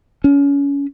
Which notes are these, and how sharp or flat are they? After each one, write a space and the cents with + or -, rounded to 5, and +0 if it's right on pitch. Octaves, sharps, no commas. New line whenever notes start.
C#4 +25